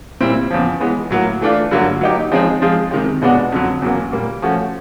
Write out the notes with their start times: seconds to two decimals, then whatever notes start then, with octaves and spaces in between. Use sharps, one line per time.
0.21 A#2 G3 C4 E4
0.51 E2 C#3 F3
0.80 E3 G#3 B3
1.11 A2 F#3 A#3
1.41 E3 A3 D4 F4
1.71 G2 D3 F#3 A#3
2.01 F#3 A#3 D#4 G4
2.32 F3 G#3 C4 D#4 G#4
2.62 F3 G#3 C4 F4 G#4
2.91 C3 D#3 G#3
3.22 B2 G#3 B3 D4 F#4
3.52 F2 D3 F#3
3.82 E2 C#3 F#3 A#3
4.12 A#2 G3 A#3
4.42 F3 A3 C#4 F#4